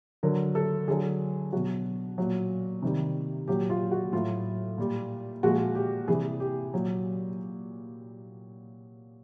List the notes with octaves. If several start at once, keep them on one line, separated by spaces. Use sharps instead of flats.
D3 F#3 A#4
A4
D3 F#3 G#4
B2 F#3 F#4
A#2 F#3
C3 D#3 G3
A#2 F#3 G4
F4
F#4
A2 F#3 F4
A#2 G3
A#2 F3 G#3 F#4
G4
C3 E3 G3 G#4
G4
A#2 F#3